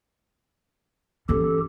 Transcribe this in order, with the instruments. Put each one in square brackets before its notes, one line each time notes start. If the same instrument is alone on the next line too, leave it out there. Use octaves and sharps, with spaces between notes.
[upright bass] E3 C#4 [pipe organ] G4 A4